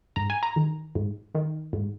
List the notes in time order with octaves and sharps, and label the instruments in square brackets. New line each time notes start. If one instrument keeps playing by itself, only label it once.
[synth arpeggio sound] G#2 A#5
G#5
A#5
D#3
G#2
D#3
G#2